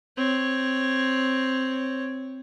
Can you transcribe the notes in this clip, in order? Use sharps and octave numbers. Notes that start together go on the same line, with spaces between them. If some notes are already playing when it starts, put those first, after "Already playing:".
C4 C#5